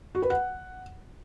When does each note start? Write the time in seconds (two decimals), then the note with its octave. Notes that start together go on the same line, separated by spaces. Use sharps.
0.15 F#4
0.22 B4
0.30 F#5